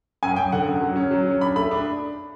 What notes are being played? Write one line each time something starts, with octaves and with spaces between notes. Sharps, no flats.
F#2 G#5
F#2 G5
D3 F#5
F#2
F#3
C#4
F#3
C#4
D4 B5
A3 B5
D4